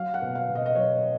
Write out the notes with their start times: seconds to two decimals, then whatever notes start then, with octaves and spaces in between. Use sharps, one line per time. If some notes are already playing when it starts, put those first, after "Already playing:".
Already playing: F#3 F5
0.14 F#5
0.22 B2
0.35 F5
0.48 B2
0.55 D#5
0.66 D#5
0.76 F#3 C#5